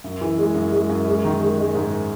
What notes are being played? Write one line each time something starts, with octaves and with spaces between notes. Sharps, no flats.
F#2
E3
G#3
F#2
G#3
F#2
G#3
D#3
G#3
G#3
G#2